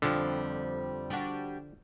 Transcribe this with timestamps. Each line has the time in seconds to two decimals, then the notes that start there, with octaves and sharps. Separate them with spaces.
0.02 F2 D3 F3 G3
1.10 G3 D4 F#4